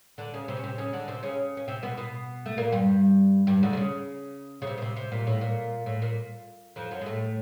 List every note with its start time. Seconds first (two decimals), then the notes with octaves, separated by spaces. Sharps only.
0.18 D3 D4
0.34 C#3 C#4
0.48 C3 C4
0.57 C#4
0.63 C3 C4
0.78 C#3 C#4
0.93 D3 D4
1.08 C3 C4
1.23 C#3 C#4
1.57 C#4
1.68 C3 C4
1.83 B2 B3
1.97 B2 B3
2.46 A3
2.57 A#2 A#3
2.72 G2 G3
3.47 G2 G3
3.63 D2 D3
3.73 C3
3.77 C#3
4.62 C#3
4.67 C3
4.77 B2
4.82 C3
4.96 C3
5.12 A#2
5.27 A2
5.41 A#2
5.86 A2
6.02 A#2
6.76 F2 F3
6.91 F#2 F#3
7.01 G#3
7.06 A2 A3